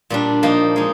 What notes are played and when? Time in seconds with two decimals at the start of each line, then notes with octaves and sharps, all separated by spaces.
0.10 A#2 G3 D4
0.43 F3 A#3 D#4
0.76 G#3 D#4